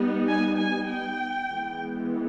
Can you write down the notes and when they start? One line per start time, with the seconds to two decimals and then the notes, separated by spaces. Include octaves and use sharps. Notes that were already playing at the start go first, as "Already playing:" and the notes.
Already playing: G3 B3 D#4
0.28 G#5
0.58 G#5
0.89 G5
1.52 E3 G#3 B3